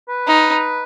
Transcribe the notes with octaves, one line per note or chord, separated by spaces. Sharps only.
B4
D#4